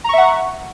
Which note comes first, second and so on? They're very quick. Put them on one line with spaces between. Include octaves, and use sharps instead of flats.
A#5 C#6 E5 F#5